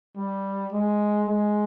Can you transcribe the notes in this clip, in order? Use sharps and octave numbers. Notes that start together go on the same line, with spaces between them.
G3
G#3
G#3